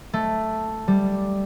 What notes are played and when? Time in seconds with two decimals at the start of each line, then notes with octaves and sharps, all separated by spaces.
0.13 A3
0.88 G3